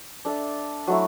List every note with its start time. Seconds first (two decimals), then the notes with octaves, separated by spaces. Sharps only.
0.25 D4 A4 E5
0.87 F#3 A3 E4